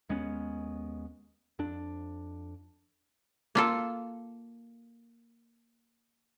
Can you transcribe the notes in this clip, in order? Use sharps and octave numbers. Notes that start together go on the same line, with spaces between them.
D#2 G#3 B3 C#4
F2 D4
A#3 F4 A4